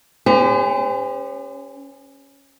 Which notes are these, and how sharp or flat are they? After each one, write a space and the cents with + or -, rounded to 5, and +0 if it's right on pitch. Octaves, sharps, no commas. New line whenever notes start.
C#4 +0 G4 +45 C5 -40